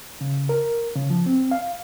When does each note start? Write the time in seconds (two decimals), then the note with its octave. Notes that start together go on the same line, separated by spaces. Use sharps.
0.21 C#3
0.49 A#4
0.96 C#3
1.10 F3
1.26 C4
1.51 F5